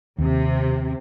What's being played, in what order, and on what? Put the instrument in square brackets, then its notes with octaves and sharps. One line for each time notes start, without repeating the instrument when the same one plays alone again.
[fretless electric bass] D#2 [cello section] C3